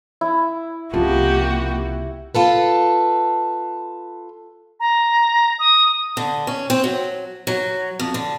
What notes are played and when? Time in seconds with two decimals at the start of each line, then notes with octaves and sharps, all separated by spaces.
0.21 E4
0.93 C2 C#3 F3 A#3 F#4 G4
2.35 F4 A4 B4
4.80 A#5
5.59 D#6
6.17 D3
6.47 C#4
6.70 C4
6.84 F#3
7.47 F#3
7.99 F2
8.14 D3